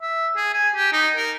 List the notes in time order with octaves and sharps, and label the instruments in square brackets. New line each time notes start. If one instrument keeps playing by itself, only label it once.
[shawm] E5
G#4
G#5
G4
D#4
A#4